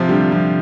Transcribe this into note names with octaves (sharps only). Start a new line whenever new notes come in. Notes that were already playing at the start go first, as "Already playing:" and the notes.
Already playing: C3 F3
D3 G3
C3 F3